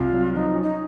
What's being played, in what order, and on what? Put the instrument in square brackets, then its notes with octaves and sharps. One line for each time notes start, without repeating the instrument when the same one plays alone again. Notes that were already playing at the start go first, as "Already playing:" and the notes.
Already playing: [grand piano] C2 [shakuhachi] F4
[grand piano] F#3
[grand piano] F3 [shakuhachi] D#4
[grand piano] C#4
[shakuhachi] D#4